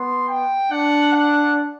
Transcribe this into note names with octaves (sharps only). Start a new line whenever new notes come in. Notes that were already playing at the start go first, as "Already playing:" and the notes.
Already playing: B3 C6
G5
D4 F#5
F#5